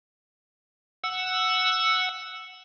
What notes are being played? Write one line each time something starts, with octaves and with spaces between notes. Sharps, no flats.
F#5 E6